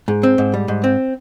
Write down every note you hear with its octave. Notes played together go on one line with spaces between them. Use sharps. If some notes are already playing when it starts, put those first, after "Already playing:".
G#2
C4
G#2
G3
G#2
C4